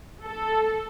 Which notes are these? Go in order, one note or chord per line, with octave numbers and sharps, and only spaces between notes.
A4